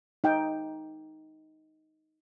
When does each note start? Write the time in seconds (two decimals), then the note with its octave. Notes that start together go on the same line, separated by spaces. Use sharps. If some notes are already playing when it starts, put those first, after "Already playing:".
0.24 D#4 G5